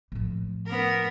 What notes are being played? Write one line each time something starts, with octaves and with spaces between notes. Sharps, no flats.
A2 F3
B3 A#4